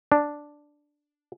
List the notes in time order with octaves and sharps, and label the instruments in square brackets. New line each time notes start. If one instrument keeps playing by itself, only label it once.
[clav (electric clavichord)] D4